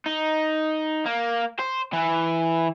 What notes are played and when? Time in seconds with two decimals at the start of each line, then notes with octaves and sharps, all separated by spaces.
0.06 D#4
1.06 A#3
1.59 C5
1.93 E3